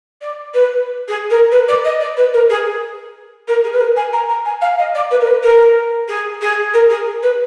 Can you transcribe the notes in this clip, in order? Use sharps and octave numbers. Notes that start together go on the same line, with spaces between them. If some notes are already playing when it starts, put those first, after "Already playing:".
D5
B4
G#4
A#4
B4
D5
D#5
D5
B4
A#4
G#4
A#4
G#4
B4
A#4
G#5
A#5
A#5
G#5
F5
D#5
D5
B4
A#4
B4
A#4
G#4
G#4
A#4
G#4
B4